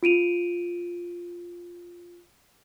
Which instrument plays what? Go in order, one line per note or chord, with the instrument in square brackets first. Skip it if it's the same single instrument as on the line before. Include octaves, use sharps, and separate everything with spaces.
[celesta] F4 D7 D#7 F7